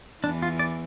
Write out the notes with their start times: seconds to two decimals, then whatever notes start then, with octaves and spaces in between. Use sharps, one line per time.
0.24 E2 E3 D4
0.42 F4
0.59 D5